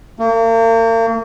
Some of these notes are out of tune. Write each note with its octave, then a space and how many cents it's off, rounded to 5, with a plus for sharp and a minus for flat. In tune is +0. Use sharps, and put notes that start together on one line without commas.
A#3 -40